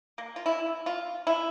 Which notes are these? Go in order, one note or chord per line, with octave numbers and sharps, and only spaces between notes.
A#3
F4
E4
F4
E4